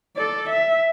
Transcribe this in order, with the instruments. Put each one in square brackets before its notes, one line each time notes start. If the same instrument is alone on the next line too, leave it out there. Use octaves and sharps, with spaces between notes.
[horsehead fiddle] A4 D5
E5